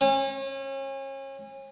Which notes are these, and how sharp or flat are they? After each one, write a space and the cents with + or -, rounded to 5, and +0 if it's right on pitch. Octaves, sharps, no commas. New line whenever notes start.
C#4 -35